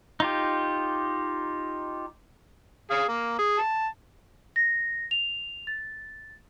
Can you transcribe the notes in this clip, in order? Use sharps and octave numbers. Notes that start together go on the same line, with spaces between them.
D#4 F4 G4
G#4 F5
A#3
G#4
A5
A#6
F7
A6